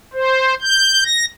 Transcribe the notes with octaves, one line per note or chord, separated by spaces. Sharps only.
C5
G6
A#6